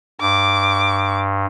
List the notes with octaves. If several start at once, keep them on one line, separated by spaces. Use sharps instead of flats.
G2 D6